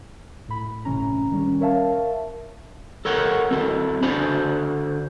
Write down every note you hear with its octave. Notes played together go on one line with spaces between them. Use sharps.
A2 B5
G1 A2 C3 E3 C#4 A#5
D#3 G3 C#4
A#4 C#5 E5 F5 A5
A4 A#4 C#5 F#5 G5
C4 F#4 A4
D3 D4 F#4 C5 G#5 B5